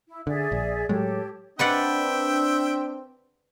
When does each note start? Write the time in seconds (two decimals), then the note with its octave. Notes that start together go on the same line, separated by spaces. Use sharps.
0.08 E4
0.27 D3 G#4 D5 E5
0.52 A#1
0.89 A2 F#3 G#3 G4 A4 C#5
1.59 C4 D4 B4 D5 E5 F#5 G5